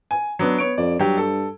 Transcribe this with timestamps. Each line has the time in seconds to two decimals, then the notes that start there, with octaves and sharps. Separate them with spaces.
0.11 G#5
0.39 F#3 B3 D4
0.59 B3 C#5 D7
0.78 F2 D5
0.99 G2 F#3 G4
1.17 A4